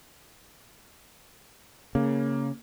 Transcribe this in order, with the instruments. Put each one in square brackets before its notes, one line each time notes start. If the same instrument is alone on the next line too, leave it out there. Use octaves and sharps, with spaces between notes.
[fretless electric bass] C#3 [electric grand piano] A#3